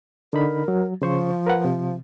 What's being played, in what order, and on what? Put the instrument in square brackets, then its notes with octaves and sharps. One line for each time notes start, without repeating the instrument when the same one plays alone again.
[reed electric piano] D3 D#4 B5 [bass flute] A#4
[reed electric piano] F#3
[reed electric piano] C#3 C5 C#6 [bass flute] F3
[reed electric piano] A#4 B4 F#5
C3